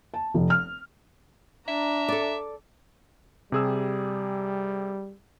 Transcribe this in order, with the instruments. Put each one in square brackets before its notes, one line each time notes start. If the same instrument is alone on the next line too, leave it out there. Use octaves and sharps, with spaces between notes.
[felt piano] A5
F1
F6
[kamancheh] D4 A#5 [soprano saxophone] E5
[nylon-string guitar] A4 D5
[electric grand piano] C3 G#4 E6 [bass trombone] G3